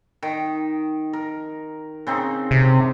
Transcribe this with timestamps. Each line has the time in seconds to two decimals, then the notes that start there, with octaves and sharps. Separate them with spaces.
0.23 D#3
1.13 A#4
2.07 C#3 C4 D#4
2.51 C3